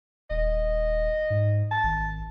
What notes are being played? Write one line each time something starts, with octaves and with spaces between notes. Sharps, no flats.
D#1 D#5
G#2
A5
G#1